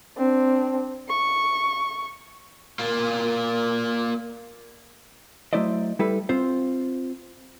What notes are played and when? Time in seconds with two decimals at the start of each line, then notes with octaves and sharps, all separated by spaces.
0.17 C4 D4
1.09 C#6
2.79 A#3 F4
5.53 F#3 A3 E4 C5 D5 D#5
5.99 G3 E4 A4 B4
6.29 C4 F4 C5